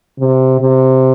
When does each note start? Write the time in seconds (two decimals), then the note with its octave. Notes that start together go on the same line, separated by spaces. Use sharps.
0.19 C3
0.61 C3